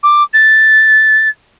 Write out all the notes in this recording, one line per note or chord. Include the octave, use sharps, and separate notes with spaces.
D6
A6